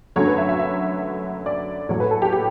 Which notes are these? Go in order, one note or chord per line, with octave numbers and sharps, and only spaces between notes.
F#2 D3 F#3 A3 C#5
B4
E5
E5
E5
D5
A2 F#3 A3 C#5
B4
A4
G4
G4